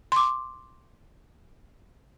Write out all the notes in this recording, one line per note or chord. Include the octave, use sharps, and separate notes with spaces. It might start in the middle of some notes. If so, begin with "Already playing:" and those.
C6 D6